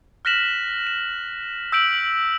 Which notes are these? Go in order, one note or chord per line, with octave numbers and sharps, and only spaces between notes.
F6 F#6 A#6 B6 E7 F#7
E7
E6 G6 B6 D7 F#7